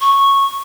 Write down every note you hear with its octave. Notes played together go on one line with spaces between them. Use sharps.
C#6